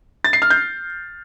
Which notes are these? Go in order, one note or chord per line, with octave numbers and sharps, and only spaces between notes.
A6
C7
F6
G6